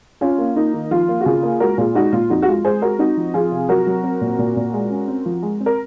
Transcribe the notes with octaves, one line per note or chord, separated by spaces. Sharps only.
C#4 F4
A#3
A#3 D#4
D#3
F3 F4
A#3
F#4
C#3 F4 G#4
A#3
G#3 F#4 A#4
A#2 F4 G#4
G#3 D#4 F#4
A#2 F4
F2 D#4 F#4
F#4
G#3 F4
G#3 G#4 C5
G#3 F#4 A#4
C4 D#4 F#4
F3
F3 F4 G#4
C3
F#3 F#4 A#4
F#3
C4
A#2
A#2
A#2
G#3
C#4
C4
F3
G#3
C4
A#4